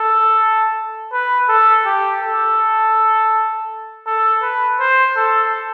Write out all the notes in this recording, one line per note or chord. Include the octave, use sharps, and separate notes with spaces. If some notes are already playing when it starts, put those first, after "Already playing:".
Already playing: A4
B4
A4
G4
A4
A4
B4
C5
A4